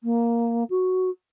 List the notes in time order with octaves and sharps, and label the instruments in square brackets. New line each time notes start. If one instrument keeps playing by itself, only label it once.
[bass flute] A#3
F#4